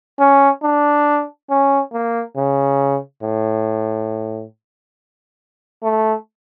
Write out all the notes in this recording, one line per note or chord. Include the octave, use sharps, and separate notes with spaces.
C#4
D4
C#4
A#3
C#3
A2
A3